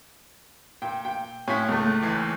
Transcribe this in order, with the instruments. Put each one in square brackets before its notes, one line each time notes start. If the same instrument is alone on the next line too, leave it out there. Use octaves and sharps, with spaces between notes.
[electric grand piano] A#2 [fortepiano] G5
[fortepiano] G5
[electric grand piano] A2 F4 B6 [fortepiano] C#4 G#5
[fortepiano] C#2 A3
[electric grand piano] D#2 E3 C7